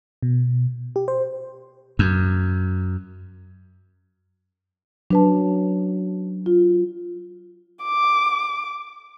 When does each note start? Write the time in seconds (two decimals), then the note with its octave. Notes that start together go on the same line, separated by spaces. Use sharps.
0.23 B2
0.96 G4
1.08 C5
1.99 F#2
5.11 F#3 D4 B4 A5
6.46 F4
7.84 D6